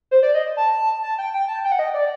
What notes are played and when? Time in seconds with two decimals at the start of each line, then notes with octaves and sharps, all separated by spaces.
0.11 C5
0.23 D5
0.34 D#5
0.57 A5
1.03 A5
1.18 G5
1.33 G5
1.48 A5
1.64 G5
1.72 F#5
1.79 D#5
1.94 D5